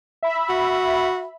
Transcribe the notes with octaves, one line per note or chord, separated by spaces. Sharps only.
E5 B5
F#4